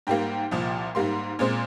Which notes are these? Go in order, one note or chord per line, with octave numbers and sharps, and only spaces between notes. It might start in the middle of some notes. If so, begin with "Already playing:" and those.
G#2 G3 A#3 G5
C2 A#2 F3
G#2 G3 A#3 C6
A#2 G#3 C4